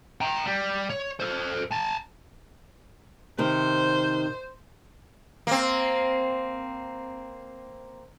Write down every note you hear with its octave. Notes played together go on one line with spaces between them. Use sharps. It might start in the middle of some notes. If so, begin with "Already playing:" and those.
G5 A#5
G3
C#5
A4 C5
G#5 A5
C3 D#3 C5
A#3 C4